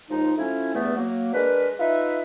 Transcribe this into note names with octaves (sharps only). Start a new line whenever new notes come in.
D#2 F3 G#3 D#4
F3 A3 C#4 E4
E2 G2 A3 B3 E5
F#3 A#3
G#3 D4 A#4 B4
D#4 F4 B4 E5